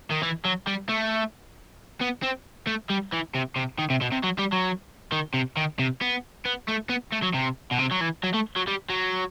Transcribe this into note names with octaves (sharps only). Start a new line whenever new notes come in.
D#3
E3
F#3
G3
A3
B3
C4
A3
G3
E3
C3
C3
D#3
C3
B2
C3
F#3
G3
F#3
D#3
C3
D#3
C3
B3
B3
A3
B3
A3
F#3
C3
B2
C3
F#3
E3
F#3
A3
F#3
G3
F#3